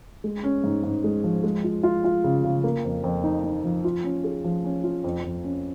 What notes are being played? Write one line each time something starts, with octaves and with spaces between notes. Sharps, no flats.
G#3
C#4
G#2
G#2
G#3
F3
G#3
F4
F4
F4
C#3
C#3
A#3
F2
F2
D#4
D#4
F3
F4
C#4
G#4
F3
C#4
F4
F2
F2
C#4